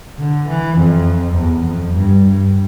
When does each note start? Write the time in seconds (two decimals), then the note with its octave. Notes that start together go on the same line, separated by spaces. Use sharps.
0.20 D3
0.48 E3
0.78 F2
1.36 E2
1.66 F2
1.95 G2
2.24 G2